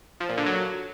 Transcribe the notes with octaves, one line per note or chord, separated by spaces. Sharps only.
F3
A#2
D3
F#3